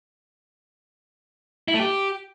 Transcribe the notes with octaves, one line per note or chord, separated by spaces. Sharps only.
E4
A3
G4